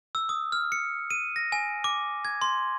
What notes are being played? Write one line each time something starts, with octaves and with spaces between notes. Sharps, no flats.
E6
D#6
F6
C#7
D#7
A#6
G#5
D6
G#6
C6